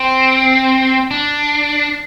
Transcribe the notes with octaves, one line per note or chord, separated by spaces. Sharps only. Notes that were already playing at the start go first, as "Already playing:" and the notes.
Already playing: C4
D4